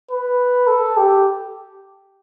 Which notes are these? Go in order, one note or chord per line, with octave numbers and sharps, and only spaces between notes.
B4
A4
G4